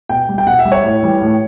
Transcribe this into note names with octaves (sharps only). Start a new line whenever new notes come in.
B2 G5
G3
G5
B2 F#5
E5
G3
C#5
A2
E3 G3
A2